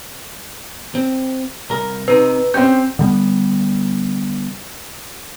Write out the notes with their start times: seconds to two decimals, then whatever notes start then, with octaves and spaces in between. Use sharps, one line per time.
0.95 C4
1.70 C2 A#4 A#5
2.08 C3 D#4 B4
2.54 C4 C#4 G4 G6
2.99 D3 G3 B3